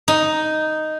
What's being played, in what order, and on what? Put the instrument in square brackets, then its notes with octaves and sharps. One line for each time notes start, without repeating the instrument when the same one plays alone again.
[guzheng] D#4